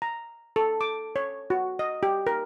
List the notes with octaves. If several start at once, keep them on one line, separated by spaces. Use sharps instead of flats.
A#5
A4
D6
C#5
F#4
D#5
G4
A#4